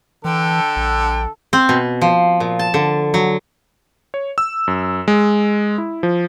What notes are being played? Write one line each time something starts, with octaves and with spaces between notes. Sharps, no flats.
D3 E3 A4 G5
A#1
C4
B2
F3
A#2
A5
D3
F#3
C#5
E6
F#2
G#3
E4
F3